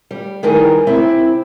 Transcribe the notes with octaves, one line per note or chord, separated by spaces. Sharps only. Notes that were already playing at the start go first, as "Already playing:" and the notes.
G3
D#3 E3 G3 G#4 A#4
C3 C4 E4